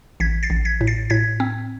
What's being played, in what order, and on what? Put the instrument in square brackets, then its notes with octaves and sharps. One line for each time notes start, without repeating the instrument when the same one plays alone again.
[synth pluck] A1 G#6 B6
A6 C7
A1
G#6 B6
A2
A6 C7
A2 G#6 B6
C4